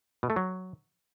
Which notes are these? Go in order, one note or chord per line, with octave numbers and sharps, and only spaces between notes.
B2
A3
F#3